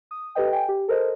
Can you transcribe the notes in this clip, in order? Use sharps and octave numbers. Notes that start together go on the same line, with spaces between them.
D#6
G4 A4 B4 D#5 G5
G5 G#5
G4
A4 A#4 C5 D#5